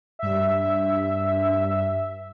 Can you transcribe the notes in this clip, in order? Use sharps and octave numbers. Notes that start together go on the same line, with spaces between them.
G2 E5